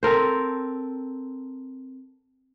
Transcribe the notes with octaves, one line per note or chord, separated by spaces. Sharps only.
C4 A4 A#4 C5